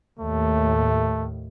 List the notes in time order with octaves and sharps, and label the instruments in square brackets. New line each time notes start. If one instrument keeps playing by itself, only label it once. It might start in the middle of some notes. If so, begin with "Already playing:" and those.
[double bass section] D#2 A2 [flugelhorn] A3